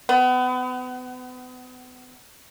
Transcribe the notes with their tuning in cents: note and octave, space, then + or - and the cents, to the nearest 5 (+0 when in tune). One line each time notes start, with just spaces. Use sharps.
B3 +35